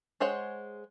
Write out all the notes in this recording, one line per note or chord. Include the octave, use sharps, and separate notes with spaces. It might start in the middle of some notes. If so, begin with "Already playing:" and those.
G#3 G#4 C5 C#5 F#5